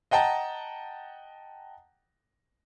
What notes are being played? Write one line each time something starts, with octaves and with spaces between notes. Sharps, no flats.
D#5 F#5 G5 A5 A#5